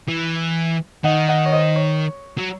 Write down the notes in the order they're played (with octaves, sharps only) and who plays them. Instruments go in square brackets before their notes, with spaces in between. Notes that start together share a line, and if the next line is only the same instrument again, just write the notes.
[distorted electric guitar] E3
[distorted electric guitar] D#3 [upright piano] D#5 F#5
[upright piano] D#5 F#5
C#5
C5 D#5
C#5
[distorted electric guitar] F#3